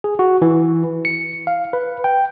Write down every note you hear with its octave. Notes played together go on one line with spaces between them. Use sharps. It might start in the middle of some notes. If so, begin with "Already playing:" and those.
G#4
F#4
E3
C#7
F5
B4
G5